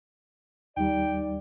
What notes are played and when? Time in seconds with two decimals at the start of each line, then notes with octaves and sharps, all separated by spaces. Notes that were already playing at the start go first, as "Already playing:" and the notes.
0.77 D#2 G3 D#4 D5 G5